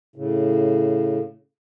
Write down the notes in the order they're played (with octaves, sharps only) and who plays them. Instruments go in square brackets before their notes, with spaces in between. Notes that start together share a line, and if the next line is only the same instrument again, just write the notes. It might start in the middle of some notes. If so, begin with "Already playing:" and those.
[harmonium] A2 C#3